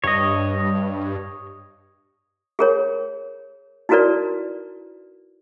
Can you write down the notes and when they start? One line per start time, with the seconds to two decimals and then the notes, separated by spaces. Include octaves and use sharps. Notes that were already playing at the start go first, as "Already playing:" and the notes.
0.04 G2 C#5 D#5
2.59 G#4 A#4 C#5
3.89 D#4 E4 F#4 A#4 B4 D5